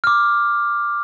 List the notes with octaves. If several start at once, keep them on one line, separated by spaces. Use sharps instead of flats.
D6 F6